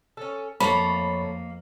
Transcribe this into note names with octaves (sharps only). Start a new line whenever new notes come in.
C#4 A4
F2 A3 A#3 C#5 A5 B5